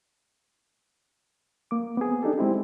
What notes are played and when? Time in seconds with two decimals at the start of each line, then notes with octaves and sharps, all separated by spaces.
1.71 A#3 D6
1.97 B3 C4 G#4
2.23 D4 D#4 G4 A4
2.38 G#3 C4 E4 G4